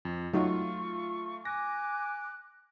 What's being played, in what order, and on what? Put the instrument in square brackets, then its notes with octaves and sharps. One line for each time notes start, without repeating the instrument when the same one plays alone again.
[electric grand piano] F2
[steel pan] F#3 D#4 F#4 [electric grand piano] A3 F4 [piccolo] C#6
[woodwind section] G#5 D6 [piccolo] F#6 [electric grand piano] A#6